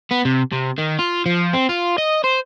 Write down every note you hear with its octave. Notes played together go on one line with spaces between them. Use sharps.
B3
C3
C3
D#3
F4
F3
C4
F4
D#5
C5